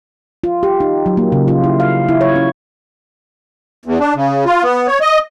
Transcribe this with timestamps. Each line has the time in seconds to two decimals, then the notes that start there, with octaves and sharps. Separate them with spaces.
0.44 F4
0.63 G4
0.80 D#4
1.06 F#3
1.17 A#3
1.32 C#3
1.48 F4
1.64 E4
1.80 F5
2.09 E4
2.21 C#5
2.36 C#4
3.86 E2
4.00 D4
4.15 C#3
4.45 F4
4.63 B3
4.87 C#5
5.01 D#5